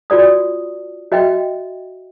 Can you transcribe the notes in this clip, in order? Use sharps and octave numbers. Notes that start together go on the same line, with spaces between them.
F4 F#4 D5 D#6
F#4 D#5 E5 G5